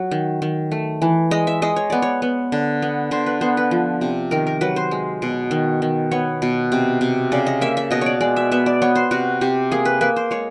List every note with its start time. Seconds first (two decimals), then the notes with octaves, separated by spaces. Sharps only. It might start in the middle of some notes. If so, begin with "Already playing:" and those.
Already playing: F#3
0.11 D#3
0.42 D#3
0.72 A3
1.02 E3
1.31 G#3 D#5
1.47 E5
1.62 G#3 D#5
1.76 C#5
1.90 B3 D5
2.02 C#5
2.22 B3
2.52 D3
2.82 B3
3.11 D3 C5
3.26 B4
3.41 B3 C5
3.57 B4
3.71 F3
4.01 C3
4.31 D#3 A#4
4.47 A#4
4.61 F#3 B4
4.76 C5
4.91 G#3
5.22 B2
5.51 D#3
5.82 D#3
6.11 B3 C#5
6.42 B2
6.72 C3
7.01 C3
7.32 C#3 D5
7.46 D#5
7.61 A#3 E5
7.77 E5
7.91 B2 D#5
8.01 C#5 D5
8.21 G#3 D5
8.36 E5
8.52 B3 E5
8.66 D5
8.82 B3 C#5
8.96 C5
9.11 C3 F#4
9.41 C3 G4
9.72 A#3 G#4
9.85 B4
10.01 A#3 B4
10.16 C5
10.31 G#3 C#5